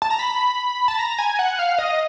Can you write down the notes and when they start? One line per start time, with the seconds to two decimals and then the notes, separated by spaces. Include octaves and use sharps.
0.02 A5
0.10 A#5
0.19 B5
0.88 A5
0.99 A#5
1.19 G#5
1.39 F#5
1.59 F5
1.78 D#5